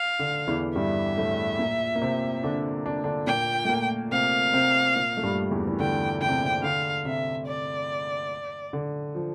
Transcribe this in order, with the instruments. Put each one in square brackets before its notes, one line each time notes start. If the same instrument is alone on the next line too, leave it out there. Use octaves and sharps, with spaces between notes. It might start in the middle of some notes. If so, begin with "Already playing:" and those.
Already playing: [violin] F5
[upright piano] D3
E2 E3
[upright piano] G2 G3 [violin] E5
[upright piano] A2 A3
A#2 A#3
A#3
C3 C4
D3 D4
D4
D3 D4
[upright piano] A#2 A#3 [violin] G5
[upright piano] A3
A#2 A#3
[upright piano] C3 C4 [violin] F5
[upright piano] C3 C4
A#2 A#3
A3
G2 G3
E2 E3
E3
[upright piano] D3 [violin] G5
[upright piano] D3 [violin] G5
[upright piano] C3
C3
[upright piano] D3 [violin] F5
[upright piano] C3 [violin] E5
[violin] D5
[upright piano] D3
F3